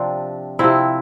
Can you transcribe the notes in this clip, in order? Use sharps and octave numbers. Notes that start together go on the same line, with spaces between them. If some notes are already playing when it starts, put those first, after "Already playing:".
Already playing: C3 F3 C4 D4
C3 F3 C4 E4